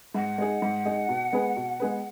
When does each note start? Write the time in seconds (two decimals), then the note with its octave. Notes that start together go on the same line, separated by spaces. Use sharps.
0.14 G#2 F#5
0.38 G#3 D#4 G#4
0.62 G#2
0.85 G#3 D#4 G#4
1.09 B2
1.33 G#3 B3 G#4 B4
1.56 B2
1.80 G#3 B3 G#4 B4